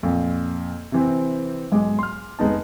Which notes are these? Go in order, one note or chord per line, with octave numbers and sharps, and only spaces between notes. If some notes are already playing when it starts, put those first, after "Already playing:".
F2 A#2
C3 E3 C4
B1 G#2 G#3 D6
C6 F6
F1 G#3 B3 D#4 A5